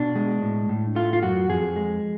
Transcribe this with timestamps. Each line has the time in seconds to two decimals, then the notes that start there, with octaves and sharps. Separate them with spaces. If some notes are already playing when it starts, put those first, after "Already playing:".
Already playing: B2 D4
0.16 G#3
0.42 A2
0.69 A2
0.95 A3 F4
1.13 F4
1.23 F#2 F#4
1.49 F2 G#4
1.76 G#3